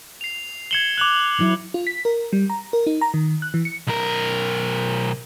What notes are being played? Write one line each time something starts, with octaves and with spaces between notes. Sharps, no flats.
C7 F7
G#6 C#7 E7 F#7 G7
D6 F#6 F7 F#7
E3 F#3 E4
F4
B6
A#4
G3
A#5
A#4
D#4
A#5
D#3
F#6
E3
C#7
B1 A#4